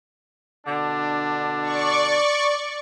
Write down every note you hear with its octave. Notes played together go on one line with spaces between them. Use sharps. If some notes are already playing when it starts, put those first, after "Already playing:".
B2 D3 D4
D5 C#6